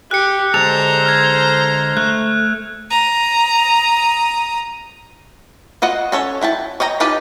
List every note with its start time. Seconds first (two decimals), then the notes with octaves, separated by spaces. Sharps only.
0.11 G4 F#6 C#7
0.54 D3 G#3 A4 C5 A#5 F7
1.05 F6 G#6
1.97 A3 F#6
2.90 A#5 D#6
5.82 F4 F#4 D#5 F#5
6.12 C#4 A4 C#5
6.41 F#3 E4 G5 A5
6.80 C#5 D#5 G5 A#5
7.00 D#4 F4 G4 B4 A5